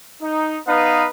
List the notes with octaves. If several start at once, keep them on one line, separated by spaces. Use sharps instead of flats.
D#4
B3 D#4 B4 F5